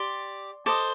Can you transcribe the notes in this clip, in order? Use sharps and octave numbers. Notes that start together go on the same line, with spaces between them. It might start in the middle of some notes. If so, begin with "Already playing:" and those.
Already playing: G4 D5 C6
A4 C5 D#5 D6